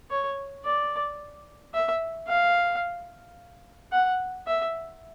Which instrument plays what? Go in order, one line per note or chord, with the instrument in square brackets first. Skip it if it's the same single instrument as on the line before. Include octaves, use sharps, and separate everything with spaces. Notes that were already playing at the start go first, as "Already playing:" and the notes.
[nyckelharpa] C#5
D5
E5
F5
F#5
E5